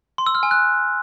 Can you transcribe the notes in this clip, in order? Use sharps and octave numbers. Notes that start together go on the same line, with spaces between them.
C6
E6
F6
G#5
F#6